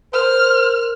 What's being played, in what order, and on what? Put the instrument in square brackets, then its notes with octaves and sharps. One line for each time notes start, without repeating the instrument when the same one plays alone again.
[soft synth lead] A#4 [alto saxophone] C5 [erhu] F6